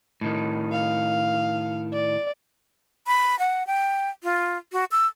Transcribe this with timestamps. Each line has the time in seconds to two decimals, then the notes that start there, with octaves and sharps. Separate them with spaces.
0.21 A2 D#3
0.72 F5
1.93 D5
3.07 B5
3.39 F#5
3.67 G5
4.23 F4
4.72 F#4
4.92 E6